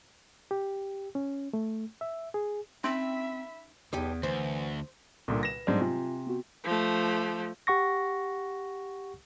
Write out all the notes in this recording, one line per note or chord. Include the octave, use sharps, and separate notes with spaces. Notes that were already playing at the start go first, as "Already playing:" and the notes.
G4
C#4
A3
E5
G#4
C4 C#4 D#4 E5 B5 C6
B1 E2 D#4 G4
D2 E3 C5
C2 A#2 D3
B4 A#6 E7
G#2 F#3 G3 A3 C4 D4
C3 F4 G#5
B3 F#4
F3 A3
G4 F#5 C#6 A#6